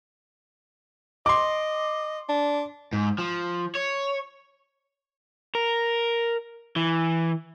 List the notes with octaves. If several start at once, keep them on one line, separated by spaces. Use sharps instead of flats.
D#5 C6 D6
D4
G#2
F3
C#5
A#4
E3